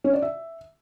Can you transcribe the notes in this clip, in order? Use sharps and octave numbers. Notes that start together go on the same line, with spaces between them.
C#4
D5
E5